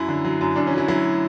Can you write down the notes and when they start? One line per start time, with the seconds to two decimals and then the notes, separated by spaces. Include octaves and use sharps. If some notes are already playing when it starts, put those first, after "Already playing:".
Already playing: F#2 F#3 E4
0.08 D3
0.25 F#3
0.41 F#2
0.56 F#2 D4
0.67 C#4
0.73 F#3
0.78 E4
0.88 F#3 E4